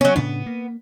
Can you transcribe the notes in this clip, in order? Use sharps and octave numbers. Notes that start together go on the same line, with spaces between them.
F#3 B3 C#4
A2 C#3 B3 D4
A#3